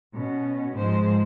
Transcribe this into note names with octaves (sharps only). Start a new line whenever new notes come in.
B2 C#4
G#2 F3 G#3 C5